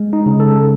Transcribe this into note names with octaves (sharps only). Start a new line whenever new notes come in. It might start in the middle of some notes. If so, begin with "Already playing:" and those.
Already playing: G#3
D#4
C#3
A4